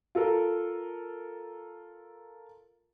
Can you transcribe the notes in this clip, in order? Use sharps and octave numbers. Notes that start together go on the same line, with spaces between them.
F4 A4 A#4